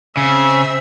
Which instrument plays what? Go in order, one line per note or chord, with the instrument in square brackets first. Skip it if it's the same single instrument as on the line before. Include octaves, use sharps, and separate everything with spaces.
[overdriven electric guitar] C#3 [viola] C4 E5